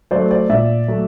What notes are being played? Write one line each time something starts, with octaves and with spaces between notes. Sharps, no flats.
F#3 A3 C5 D5
C5 D5
A#2 D5 E5
F#3 A3